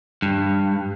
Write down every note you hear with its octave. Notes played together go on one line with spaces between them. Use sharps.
G2